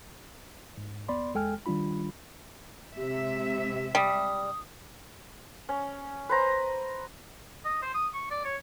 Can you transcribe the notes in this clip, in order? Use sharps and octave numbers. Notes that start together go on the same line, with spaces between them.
G#2
D#2 B3 D5 B5 C6
E2 G#3 A4 G5 G#5 F6
D#3 G3 D4 F4 B5
C3 G#3 G4 E5
G3 D#6
C#4
B4 C5 A#5
D#5
C5
D#6
C#6
D5
C#5